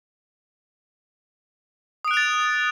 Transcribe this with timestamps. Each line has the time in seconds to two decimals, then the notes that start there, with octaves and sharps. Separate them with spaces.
2.05 D#6
2.08 D7
2.11 F#6
2.14 F7
2.17 A6